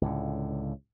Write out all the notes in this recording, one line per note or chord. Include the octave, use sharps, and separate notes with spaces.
C#2 A2 D3